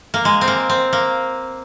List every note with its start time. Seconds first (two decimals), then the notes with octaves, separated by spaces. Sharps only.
0.14 A#3
0.25 G#3
0.41 C4
0.48 A#3
0.69 C4
0.93 A#3